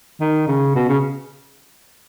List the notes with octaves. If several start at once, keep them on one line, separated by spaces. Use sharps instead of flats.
D#3
C#3
B2
C#3